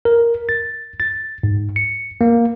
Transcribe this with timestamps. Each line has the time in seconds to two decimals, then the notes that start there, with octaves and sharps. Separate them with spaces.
0.05 A#4
0.49 A6
1.00 A6
1.43 G#2
1.76 C#7
2.21 A#3